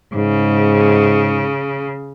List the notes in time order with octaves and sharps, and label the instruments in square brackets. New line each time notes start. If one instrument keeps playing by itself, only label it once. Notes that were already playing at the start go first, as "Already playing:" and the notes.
[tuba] G#2 [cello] C#3